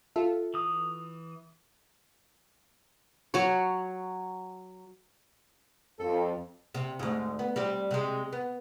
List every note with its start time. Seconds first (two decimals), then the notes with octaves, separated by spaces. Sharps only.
0.16 F4 A4 E5
0.54 E3 D#6
3.34 F#3 C#5
5.99 F2 A4
6.74 C3
6.99 D2 G#2
7.39 B3
7.56 G3 C4 G4
7.91 C3 G#3
8.33 B3